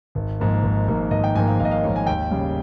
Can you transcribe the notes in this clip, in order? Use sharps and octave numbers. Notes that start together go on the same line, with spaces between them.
G#1
G#2 F3 A#3
G#1
G#2 F3 A#3
G#1 D#5
G5
G#2 F3 A#3 G#5
F5
G#1 F5
D#5
F5
G#2 F3 A#3 C#5
G#5
D#2 G5
C#3 G3